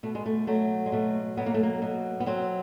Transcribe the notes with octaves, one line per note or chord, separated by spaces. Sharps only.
B2 A3
G#3
A3
F#3 A3
G#3
B2 A3
F#3 B3
A#3
A3
A#3
B2
B3
F#3 C4